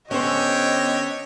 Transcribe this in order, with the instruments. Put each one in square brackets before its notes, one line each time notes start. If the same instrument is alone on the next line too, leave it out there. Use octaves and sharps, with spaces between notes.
[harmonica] D3 G4 C#5 [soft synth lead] B3 [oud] C#4 C5 [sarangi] D#5